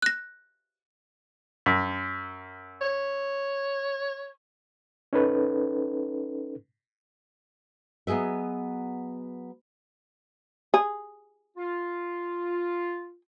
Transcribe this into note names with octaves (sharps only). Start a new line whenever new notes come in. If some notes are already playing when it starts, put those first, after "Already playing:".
F#6 A#6
F#2
C#5
C#4 D#4 A4 B4
F#3 B3 G#4 D#5 E5
G#4
F4